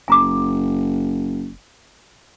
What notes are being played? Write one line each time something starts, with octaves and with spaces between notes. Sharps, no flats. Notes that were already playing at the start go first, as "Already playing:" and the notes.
F#1 G#5 A#5 D6